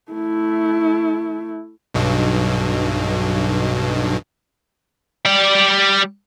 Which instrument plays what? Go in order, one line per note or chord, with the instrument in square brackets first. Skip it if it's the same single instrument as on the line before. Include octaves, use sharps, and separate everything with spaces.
[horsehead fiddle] A3 E4
[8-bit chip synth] B1 G2 B2
[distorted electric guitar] G3 D5